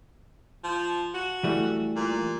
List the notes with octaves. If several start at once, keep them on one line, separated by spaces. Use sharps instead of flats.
F3
F#4
E3 G3 A3
A#2